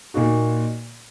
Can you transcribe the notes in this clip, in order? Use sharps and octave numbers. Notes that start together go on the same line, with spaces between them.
A#2 A#3 D#4 F#4